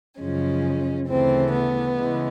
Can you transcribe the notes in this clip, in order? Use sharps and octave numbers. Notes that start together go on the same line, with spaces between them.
F#2 C#3 F3 G#3 C#4
D2 C#3 E3 A3 C4
B3
C#3 E3 G#3